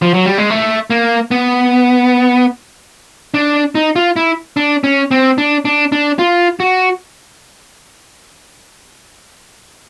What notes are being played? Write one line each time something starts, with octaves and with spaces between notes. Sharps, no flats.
F3
F#3
G3
G#3
A3
A#3
B3
D4
D#4
F4
E4
D4
C#4
C4
D4
D4
D4
F4
F#4